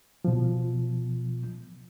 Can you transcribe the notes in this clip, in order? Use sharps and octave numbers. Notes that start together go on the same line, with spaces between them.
B2 F3